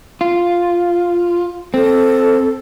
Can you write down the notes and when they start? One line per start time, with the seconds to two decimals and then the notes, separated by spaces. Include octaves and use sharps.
0.21 F4
1.74 C4 A4